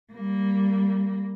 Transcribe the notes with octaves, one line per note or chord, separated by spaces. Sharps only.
G3 A#3